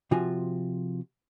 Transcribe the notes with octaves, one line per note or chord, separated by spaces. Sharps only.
C3 F3 F4 F#4 G#5 C6